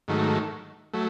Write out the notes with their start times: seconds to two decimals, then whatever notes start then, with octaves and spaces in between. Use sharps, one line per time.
0.08 G#2 D#3 F#3 A3
0.93 F#3 A3